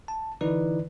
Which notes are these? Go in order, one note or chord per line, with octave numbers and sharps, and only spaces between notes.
A5
D3 E3 D#4 E4 B4 D5